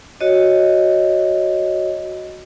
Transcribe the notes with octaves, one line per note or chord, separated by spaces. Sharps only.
F#4 C#5 D#5